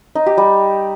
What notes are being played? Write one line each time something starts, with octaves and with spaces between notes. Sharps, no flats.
D#4
G4
G3